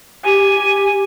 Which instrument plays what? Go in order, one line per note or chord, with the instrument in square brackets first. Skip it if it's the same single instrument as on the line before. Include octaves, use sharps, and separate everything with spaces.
[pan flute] G4 [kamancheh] G#5